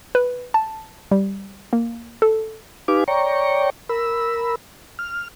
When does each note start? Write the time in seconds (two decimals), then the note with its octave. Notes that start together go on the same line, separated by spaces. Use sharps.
0.15 B4
0.54 A5
1.11 G3
1.73 A#3
2.22 A4
2.88 D#4 G4 B4 F5 G#5 D6
3.08 C#5 D5 G5 A#5 C#6
3.89 A#4 B5 E6
4.99 F6